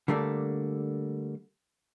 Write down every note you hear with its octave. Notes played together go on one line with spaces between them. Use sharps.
D3 G3 A3 A#3 D4